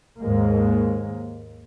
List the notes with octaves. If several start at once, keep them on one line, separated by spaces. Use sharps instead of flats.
D#2 G#2 G#3 A#3